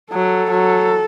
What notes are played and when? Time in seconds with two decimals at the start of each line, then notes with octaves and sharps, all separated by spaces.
0.13 F#3 A4
0.51 F#3